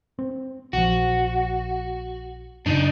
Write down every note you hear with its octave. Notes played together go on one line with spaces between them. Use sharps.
C4
A#1 F3 F#4
F#2 C#3 D4 D#4